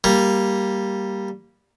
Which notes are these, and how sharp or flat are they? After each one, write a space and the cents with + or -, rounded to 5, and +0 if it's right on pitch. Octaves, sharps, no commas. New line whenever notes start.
G3 +0 A#3 +0